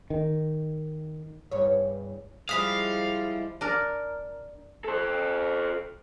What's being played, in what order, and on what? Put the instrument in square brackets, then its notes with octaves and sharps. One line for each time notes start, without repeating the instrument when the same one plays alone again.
[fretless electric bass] D#3
[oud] E2 G2 C#5
[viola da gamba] F3 G3 [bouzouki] G#3 E4 [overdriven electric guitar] F5 [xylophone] D#6 B6
[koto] D4 A#4
[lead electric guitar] A4 C5